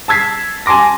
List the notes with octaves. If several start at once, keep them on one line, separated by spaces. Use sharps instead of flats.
A5 E6 G#6 B6 C7
G#5 A5 C6 D6 A#6